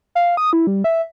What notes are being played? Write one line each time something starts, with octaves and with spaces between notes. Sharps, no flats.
F5
D#6
E4
G3
E5